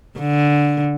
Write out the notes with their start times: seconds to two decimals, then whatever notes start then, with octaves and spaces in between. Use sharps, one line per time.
0.19 D3